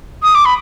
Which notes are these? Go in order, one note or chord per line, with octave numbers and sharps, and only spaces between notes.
D#6
D6
B5